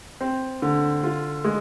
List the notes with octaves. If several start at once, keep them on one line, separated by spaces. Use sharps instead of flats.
C4
D3
F4
G#3